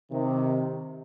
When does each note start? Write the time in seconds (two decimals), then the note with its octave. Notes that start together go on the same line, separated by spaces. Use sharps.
0.11 C3 D#3